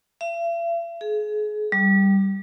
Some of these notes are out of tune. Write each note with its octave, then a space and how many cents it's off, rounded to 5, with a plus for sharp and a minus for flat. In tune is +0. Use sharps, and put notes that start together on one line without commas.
E5 +45
G#4 +30
G3 -5